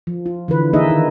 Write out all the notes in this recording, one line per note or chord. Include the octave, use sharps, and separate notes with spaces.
F3
F4
D3 E3 B4
E3 A#3 D#4 G#4 D#5 E5
D#3